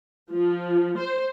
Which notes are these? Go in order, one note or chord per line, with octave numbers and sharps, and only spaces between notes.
F3
C5